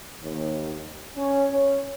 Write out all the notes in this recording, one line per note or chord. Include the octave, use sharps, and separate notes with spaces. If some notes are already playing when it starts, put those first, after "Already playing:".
D#2
C#4
C#4